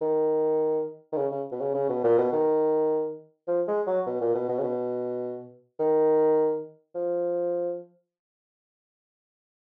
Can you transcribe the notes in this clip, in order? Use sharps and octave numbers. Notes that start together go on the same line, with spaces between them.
D#3
D#3
C#3
C#3
B2
C#3
C#3
B2
A#2
B2
D#3
F3
G#3
F#3
B2
A#2
B2
B2
C#3
B2
D#3
F3